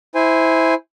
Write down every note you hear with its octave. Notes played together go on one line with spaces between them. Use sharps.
E4 C5 G#5